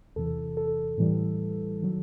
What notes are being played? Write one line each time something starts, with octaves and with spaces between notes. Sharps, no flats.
E2 C3 E3 A4
A4
A2 E3 G3
D#3 F#3